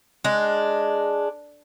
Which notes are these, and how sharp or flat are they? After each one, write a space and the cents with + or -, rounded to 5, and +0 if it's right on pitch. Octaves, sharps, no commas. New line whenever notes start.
G#3 +0 D4 +0